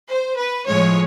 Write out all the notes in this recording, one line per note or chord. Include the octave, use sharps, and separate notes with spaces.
C5
B4
A2 F3 G#3 C#5